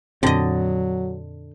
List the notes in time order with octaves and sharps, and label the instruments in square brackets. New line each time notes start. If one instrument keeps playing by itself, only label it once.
[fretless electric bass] F2 A#2 C4 [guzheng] D3 D#5 [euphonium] F#3